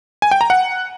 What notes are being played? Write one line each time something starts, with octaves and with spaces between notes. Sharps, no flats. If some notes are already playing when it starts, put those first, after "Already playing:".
G#5
G5
A#5
F#5